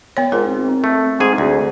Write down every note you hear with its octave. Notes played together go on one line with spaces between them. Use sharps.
B3 C#5
G#2 F4 A#4
C4
A3
G#2 C4 G#4 G#5
D2 G#4